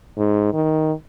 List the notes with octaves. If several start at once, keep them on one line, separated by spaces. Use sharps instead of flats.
G#2
D#3